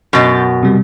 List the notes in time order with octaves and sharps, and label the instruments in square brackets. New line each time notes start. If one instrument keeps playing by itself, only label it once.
[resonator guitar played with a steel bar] F#2 B2 [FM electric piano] B5 G6 A6
[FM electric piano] C3 G3